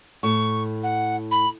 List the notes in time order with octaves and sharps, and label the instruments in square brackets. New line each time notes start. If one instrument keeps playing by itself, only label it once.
[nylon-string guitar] A2 [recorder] C#6
[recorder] F#5
B5